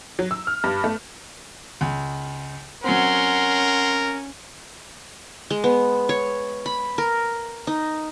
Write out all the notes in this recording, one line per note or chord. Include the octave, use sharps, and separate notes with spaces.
F#3
E6
F6
G2
A3
C#2
F#3 C4 C#4 A#4 F#5 C6
G#3
B3
C#5
B5
A#4
D#4